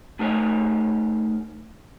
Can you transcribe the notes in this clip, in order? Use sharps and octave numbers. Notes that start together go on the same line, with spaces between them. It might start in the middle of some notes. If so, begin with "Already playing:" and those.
A3 D#4 A#4 C5 C#5 G#5